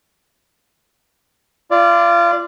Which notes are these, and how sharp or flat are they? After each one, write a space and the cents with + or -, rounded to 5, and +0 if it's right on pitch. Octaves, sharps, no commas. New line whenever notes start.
F4 -30 D5 +0